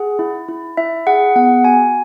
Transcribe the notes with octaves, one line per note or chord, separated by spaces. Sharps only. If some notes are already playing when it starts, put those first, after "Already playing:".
Already playing: G#4 F#5
E4
E4
E4 E5
G#4 F#5
B3 F#5
F#4 G#5